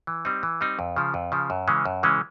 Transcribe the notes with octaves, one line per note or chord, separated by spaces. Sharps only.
E3
G3 C4 D#4
E3
G3 C4 D#4
F2
C#3 F3
F2
C#3 F3
F#2
C#3 E3 G#3 C#4
F#2
C#3 E3 G#3 C#4